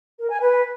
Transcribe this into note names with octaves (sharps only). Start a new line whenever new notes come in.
A#4
G#5
B4